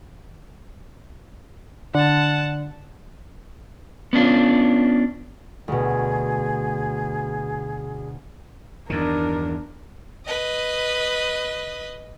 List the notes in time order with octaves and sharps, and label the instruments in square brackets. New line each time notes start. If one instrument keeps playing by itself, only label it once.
[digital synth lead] D3 [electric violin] F#5 A5
[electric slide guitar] B3 C#4 D4 F4
[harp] D2 B2 [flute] G#4
[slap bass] E2 G2 D#3 [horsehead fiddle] D4 A#4
[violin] B4 D#5